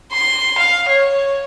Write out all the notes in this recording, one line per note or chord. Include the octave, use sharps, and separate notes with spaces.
C6
F5
C#5